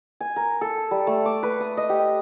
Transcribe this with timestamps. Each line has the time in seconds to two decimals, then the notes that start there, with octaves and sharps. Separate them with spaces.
0.21 G#5
0.36 A#4
0.61 A4
0.91 G3
1.07 A3
1.25 D6
1.43 B4
1.60 D#6
1.77 D#5
1.89 G4